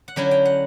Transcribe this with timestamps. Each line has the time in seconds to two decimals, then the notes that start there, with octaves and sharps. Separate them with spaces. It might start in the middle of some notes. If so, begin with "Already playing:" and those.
0.08 F#5
0.16 D3 F#3 C#4 E4 G5
0.31 G5
0.45 F#5